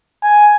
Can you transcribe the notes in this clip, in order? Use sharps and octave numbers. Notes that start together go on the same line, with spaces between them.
G#5